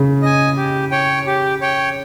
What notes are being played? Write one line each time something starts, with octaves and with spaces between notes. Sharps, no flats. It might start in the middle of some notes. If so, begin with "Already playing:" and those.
Already playing: C#3
D#5 G#5
G4
C#5 G5
G4
C#5 G5